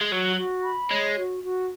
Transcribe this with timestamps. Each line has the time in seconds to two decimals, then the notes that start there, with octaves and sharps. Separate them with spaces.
0.01 G#3
0.11 F#3 F#4
0.37 F#4
0.64 B5
0.91 G#3 C#5
1.17 F#4
1.43 F#4